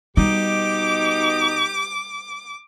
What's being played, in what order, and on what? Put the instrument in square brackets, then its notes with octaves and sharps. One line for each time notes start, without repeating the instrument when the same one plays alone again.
[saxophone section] B2 D#4 [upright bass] G3 [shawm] G4 [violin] D6